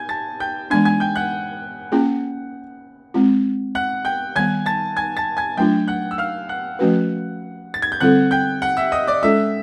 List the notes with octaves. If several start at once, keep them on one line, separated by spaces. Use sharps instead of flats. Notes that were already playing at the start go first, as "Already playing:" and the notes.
Already playing: G#5 G6 G#6
A5 A6
G5 G6
E3 G#3 B3 D4 G#5 G#6
G#5 G#6
G5 G6
F#5 F#6
A#3 C#4 F4 G#4
G#3 C4 F4
F#5 F#6
G5 G6
D#3 G3 B3 G#5 G#6
A5 A6
G#5 G#6
A5 A6
G#5 G#6
F#3 A3 D4 F4 G5 G6
F#5 F#6
E6
F5 F6
F#5 F#6
F3 A3 C#4 F#4 B4
A6
G#6
G6
D3 G3 C4 F4 A4 F#5 F#6
G5 G6
F#5 F#6
E5 E6
D#5 D#6
D5 D6
G#3 C#4 F4 A4 E5 E6